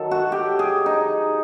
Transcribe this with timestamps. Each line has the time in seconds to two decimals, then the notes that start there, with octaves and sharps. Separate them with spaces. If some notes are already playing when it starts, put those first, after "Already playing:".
Already playing: D#3 F#3 A4
0.11 F#4
0.32 G4
0.59 G#4
0.86 D#4